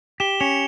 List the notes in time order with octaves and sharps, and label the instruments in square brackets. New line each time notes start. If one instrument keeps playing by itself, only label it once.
[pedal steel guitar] G4 [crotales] E7 G7
[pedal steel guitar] C#4 [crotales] C#7 F7